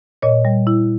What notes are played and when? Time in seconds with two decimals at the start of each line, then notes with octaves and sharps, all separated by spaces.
0.22 A#2 C#5 D#5
0.45 G3
0.67 E4